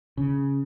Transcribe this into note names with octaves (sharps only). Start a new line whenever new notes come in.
C#3